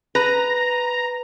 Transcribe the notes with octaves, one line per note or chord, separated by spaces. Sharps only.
B4 A#5